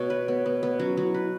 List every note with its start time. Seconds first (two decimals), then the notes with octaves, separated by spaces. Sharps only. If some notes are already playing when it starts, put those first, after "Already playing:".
Already playing: B2 F#4 C#5
0.10 B4
0.28 B3
0.46 B3
0.63 B3
0.79 F#3 C#4
0.97 F#3
1.03 E4
1.14 E4 B4